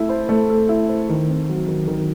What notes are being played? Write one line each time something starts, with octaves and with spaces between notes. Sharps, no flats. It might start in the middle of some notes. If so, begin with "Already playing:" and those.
Already playing: A3 E4 A4
C5
A3
A4
E4
C5
D#3
C4
F#3
D#3
D#3